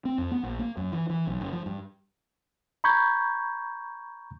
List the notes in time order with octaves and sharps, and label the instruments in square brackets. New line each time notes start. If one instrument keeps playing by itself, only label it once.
[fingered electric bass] C4
F2
B3
A#1
A#3
F#2
E3
E3
B1
F#1
F3
G2
[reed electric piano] A#5 B5 C#6 G6 G#6